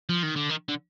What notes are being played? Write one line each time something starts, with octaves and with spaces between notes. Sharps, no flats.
F3
D#3
D3
D#3
D3